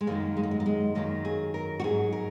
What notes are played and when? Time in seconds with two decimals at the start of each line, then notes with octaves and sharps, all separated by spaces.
0.01 G#3
0.07 F#2 D#3 F#3 A#3
0.37 G#3
0.43 A#3
0.51 G#3
0.60 A#3
0.66 G#3
0.95 F#2 D#3 F#3 A#3
1.25 G#4
1.54 A#4
1.80 F#4
1.84 G#2 F#3 G#4
2.13 A#4